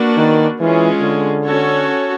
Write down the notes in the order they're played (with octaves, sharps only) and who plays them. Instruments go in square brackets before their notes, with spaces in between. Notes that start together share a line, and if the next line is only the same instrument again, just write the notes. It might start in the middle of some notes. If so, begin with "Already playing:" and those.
Already playing: [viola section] A#3 D4 F#4 B4 D5
[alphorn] D#3
[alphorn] E3 [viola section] G#3 C#4 F4 G#4
[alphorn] D3
[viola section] C#4 F#4 A4 C#5